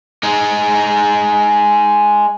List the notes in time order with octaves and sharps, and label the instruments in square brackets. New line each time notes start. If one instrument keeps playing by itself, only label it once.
[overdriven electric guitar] G#3 D#4